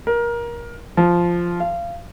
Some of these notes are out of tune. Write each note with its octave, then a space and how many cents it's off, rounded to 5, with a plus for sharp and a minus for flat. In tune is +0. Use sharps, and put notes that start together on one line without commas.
A#4 +20
F3 -5
F5 -25